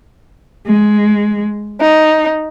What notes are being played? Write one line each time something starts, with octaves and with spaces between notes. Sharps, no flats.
G#3
D#4